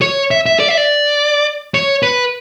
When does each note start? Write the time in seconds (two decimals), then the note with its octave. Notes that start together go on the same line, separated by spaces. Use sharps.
0.02 C#5
0.31 E5
0.46 E5
0.60 D5
0.68 E5
0.77 D5
1.74 C#5
2.03 B4